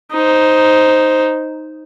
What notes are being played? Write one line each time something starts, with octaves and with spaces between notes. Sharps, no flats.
D#4 C5